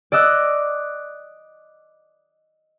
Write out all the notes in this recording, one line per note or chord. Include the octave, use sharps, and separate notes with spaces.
D5 D#5 E6 F#6